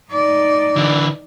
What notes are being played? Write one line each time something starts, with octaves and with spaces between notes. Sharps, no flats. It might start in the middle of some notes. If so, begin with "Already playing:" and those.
D#4 D5
D3 E3